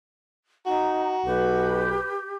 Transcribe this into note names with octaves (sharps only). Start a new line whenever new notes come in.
D#4 F#4 A#5
B1 G4 B4